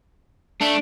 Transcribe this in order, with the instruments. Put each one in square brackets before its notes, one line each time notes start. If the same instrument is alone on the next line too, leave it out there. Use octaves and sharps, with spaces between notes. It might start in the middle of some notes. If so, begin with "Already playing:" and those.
[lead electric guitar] A3 [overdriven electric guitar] D4